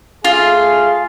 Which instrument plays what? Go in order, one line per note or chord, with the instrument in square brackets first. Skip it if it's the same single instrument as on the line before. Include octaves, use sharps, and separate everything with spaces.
[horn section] A3 G#4 F5 [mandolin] F4